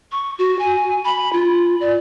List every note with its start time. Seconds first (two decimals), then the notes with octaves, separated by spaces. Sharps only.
0.12 C#6
0.39 F#4
0.59 G#5
1.05 B5
1.33 F4
1.81 D5